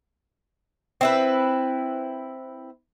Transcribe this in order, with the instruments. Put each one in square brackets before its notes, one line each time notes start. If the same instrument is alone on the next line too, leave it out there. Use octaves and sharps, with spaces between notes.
[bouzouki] C4 E4 B4